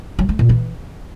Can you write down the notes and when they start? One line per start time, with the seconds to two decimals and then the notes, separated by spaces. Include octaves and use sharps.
0.19 F#3
0.29 A3
0.39 A#2
0.49 E3